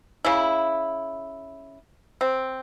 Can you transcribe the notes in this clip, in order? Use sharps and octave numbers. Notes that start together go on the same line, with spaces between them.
C#3 E4
C4